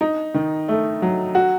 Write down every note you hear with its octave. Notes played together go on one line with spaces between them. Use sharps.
D#4
D#3
A3
F#3
F#4